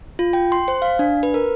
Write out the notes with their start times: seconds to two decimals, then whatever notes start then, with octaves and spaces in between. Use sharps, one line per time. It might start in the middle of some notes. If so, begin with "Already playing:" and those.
0.19 F4
0.33 G5
0.52 C6
0.68 C5
0.82 F5
0.99 D4
1.23 B4
1.34 A#4